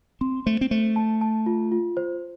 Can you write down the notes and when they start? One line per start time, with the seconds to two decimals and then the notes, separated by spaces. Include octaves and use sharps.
0.21 C4 C6
0.46 A3 C5
0.61 C4
0.71 A3 C5
0.96 A5
1.21 A5
1.46 F4
1.72 F4
1.97 C5